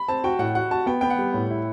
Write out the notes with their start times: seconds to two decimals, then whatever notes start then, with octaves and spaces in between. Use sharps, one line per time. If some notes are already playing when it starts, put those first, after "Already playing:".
Already playing: B5
0.08 C4 A5
0.24 F#4 G5
0.39 A2 F#5
0.55 F#4 F#5
0.71 F#4 A5
0.86 B3 G5
1.01 B3 G5
1.10 F#5
1.18 G3
1.34 A2
1.50 E4